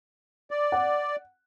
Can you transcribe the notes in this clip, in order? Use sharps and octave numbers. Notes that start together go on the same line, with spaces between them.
D5
F#5